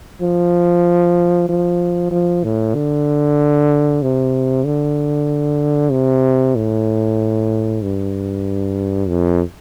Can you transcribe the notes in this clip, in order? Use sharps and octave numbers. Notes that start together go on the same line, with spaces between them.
F3
F3
F3
A2
D3
C3
D3
C3
A2
G2
F2